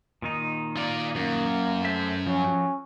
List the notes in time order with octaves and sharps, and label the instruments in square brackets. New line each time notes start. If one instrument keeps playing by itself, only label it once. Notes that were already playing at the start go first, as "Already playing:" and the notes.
[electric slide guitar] A#2 D#3 D#4
[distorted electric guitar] F4 D5
[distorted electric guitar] F#2 [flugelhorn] A#3
[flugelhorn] A3 [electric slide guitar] C5 E5
[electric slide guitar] F3 F#3 [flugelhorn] C#4